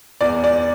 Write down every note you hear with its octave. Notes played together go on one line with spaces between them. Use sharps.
E2 D5
D5